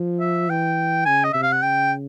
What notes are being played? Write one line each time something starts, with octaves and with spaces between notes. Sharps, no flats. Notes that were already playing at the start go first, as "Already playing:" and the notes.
Already playing: F3
E5
E3 G5
C#3 G#5
D#5
C3 E5
F5
F#5
C#3 G5